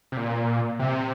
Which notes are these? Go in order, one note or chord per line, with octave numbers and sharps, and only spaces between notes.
C3
A#2
C3